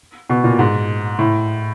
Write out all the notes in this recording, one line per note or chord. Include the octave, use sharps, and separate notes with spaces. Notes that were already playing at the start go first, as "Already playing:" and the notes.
B2
A#2
G#2
A2